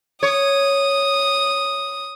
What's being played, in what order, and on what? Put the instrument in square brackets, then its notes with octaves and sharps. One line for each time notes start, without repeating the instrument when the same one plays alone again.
[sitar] C#5 [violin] D#6